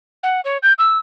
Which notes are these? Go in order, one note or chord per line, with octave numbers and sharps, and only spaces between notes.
F#5
C#5
G6
E6